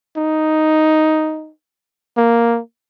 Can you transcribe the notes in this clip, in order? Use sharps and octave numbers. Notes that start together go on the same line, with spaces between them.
D#4
A#3